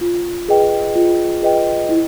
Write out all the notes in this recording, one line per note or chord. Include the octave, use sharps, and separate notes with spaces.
F4
G#4 B4 D#5 G5
F4
G#4 B4 D#5 G5
E4